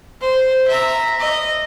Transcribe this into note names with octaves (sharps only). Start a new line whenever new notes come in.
C5
E5 A#5
D#5